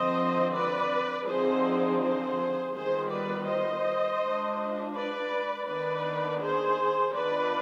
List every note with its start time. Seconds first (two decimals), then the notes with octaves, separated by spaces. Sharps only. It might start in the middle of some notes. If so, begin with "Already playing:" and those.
Already playing: D3 F3 C4 C5 D#5
0.54 B4 D5
1.27 D3 F3 C4 D#4 G#4 C5
2.00 G#4 C5
2.74 D#3 G3 B3 F4 G#4 C5
3.10 B4 D5
3.47 C5 D#5
4.21 G#3 D4 F4
4.94 B4 D5
5.67 D#3 B3 D4 B4 D5
6.41 G#4 C5
7.13 D#3 B3 D4 F4 B4 D5